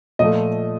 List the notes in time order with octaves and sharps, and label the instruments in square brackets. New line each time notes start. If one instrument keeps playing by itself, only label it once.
[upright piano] A#2 F3 A3 D#5